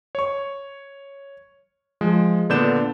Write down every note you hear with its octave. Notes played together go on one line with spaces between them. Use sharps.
C#5 C#6
F3 G#3
A#2 D3 B3 D4 G6 E7